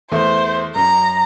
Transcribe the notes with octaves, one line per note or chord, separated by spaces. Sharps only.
E2 A3 C5
F#2 A#5